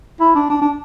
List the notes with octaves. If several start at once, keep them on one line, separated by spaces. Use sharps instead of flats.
E4
D4
D4
D4